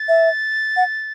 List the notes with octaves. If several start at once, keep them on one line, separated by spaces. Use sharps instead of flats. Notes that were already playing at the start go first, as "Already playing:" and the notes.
Already playing: A6
E5
F#5